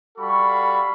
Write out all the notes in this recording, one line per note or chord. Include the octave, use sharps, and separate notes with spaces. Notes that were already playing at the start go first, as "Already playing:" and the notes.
G3 F#4 A4 F5 B5 C#6